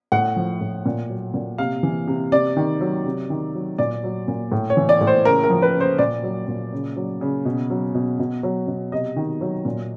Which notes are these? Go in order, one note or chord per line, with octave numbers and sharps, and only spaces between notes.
A2 F#5
F3
A2
A#2
F#3
A#2
C3 F5
E3
C3
C3 D5
D#3
F#3
C3
D#3
F#3
A#2 D5
F#3
A#2
A2
C#5
E3
D5
A2
C5
C#3 A#4
A#4
F3
B4
C#3
C5
A#2 D5
F#3
A#2
C#3
F#3
C#3
B2
F#3
B2
B2
F#3
B2
C3 D#5
D#3
F#3
A#2